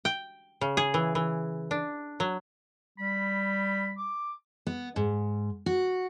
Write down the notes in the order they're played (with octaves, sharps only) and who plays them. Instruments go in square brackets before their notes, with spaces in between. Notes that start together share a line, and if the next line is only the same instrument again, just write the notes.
[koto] G5
C#3
G#4
E3
E3
D4
F#3
[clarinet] G3 [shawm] B5
[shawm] D6
[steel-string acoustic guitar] B3
G#2
F#4